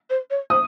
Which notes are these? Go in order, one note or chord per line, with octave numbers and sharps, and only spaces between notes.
C5
C#5
C5 D#6